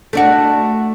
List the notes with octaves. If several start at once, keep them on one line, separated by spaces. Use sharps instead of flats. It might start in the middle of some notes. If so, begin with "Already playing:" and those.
A3 D4 F#4